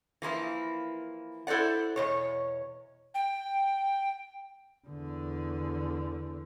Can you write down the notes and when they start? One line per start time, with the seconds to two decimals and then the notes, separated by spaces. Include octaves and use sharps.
0.22 E3 F3 A#3 E4
1.47 E4 A4 C5 D5 F#5
1.96 E2 B2 C#5
3.15 G5
4.88 E2 D3